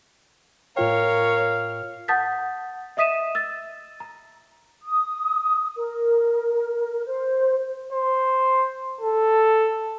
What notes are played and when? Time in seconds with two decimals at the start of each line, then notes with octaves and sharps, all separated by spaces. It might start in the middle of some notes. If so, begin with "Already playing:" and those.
0.77 A2 F4 A#4 C#5 F5 G5
2.08 F#5 A5 D#6 G6 A6 B6
2.97 D#5 E5 D#6 B6 D#7 E7
3.35 E6 A6
4.00 A#5
4.84 D#6
5.77 A#4
7.06 C5
7.93 C5
9.01 A4